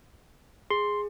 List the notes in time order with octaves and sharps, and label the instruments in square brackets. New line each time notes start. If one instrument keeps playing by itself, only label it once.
[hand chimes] G#4 [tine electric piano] C6